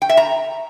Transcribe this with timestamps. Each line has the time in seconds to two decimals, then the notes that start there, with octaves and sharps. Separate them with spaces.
0.02 G5
0.09 E5
0.17 A#5